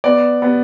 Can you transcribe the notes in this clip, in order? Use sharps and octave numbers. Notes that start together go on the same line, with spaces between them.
B3 D5
B3